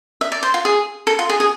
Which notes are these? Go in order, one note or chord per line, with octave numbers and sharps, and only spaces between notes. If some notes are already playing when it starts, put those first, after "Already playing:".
E5
D5
C5
F4
G#4
A4
F4
G#4
G#4